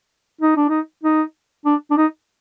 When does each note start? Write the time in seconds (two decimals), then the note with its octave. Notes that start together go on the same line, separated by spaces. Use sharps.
0.42 D#4
0.56 D4
0.70 D#4
1.04 D#4
1.66 D4
1.91 D4
1.97 D#4